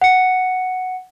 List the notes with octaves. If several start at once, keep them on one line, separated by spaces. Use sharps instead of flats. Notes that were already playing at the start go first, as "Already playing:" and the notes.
F#5 C#7